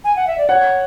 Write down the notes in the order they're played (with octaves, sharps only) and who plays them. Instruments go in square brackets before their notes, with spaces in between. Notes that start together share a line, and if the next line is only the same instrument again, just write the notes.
[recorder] G#5
F#5
E5
D5
[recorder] C#5 [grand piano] F#5